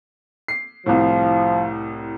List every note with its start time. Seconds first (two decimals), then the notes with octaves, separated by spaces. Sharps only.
0.48 C7
0.86 C2 A2 F3